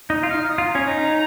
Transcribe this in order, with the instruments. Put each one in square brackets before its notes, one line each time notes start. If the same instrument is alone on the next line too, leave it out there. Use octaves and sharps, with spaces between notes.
[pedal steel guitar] D#4 [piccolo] D#5
[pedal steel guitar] F4
[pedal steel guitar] D#4 [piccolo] F6
[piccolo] D#6
[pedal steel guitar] F4
[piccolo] A#5
[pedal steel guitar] C#4
D#4